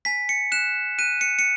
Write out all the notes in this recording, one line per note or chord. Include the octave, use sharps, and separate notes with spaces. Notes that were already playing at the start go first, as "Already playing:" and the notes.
G#5 B6
C#7
F#6 E7
F#6 D#7
C#7
C#7